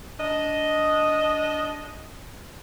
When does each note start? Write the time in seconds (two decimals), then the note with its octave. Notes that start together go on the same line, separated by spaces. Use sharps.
0.20 D4 D#5